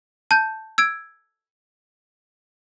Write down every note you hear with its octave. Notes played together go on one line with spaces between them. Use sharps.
A5 G6
E6 G#6 D7